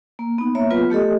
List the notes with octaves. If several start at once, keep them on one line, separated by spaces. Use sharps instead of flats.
A#3
B3 D#4
A#3 C#5 E5
F#3 B3 F4 B4
A3 G4 A4 D#5